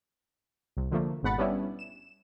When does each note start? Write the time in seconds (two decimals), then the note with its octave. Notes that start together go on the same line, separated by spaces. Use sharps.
0.77 C2
0.91 D3 F3 A3 A#3
1.23 G#1 G#2 B2 F#5 B5 A6
1.38 G3 B3 C#4 D4 E4
1.79 E7